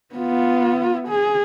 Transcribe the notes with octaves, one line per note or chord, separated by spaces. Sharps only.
B3 F4
G#4